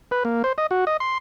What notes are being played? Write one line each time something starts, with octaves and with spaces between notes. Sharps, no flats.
B4
A#3
C5
D#5
F#4
D#5
C6